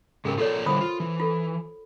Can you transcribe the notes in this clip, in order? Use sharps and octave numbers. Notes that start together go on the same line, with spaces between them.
G#2 C#3 G4 G#4 A#4
F4 G#4 A4 C#5 D5
D3 E3 G3 C5 B5 D#6
F4
E3
F4 A4